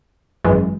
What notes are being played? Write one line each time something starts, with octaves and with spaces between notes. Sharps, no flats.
G#1 F#2 E3 G#3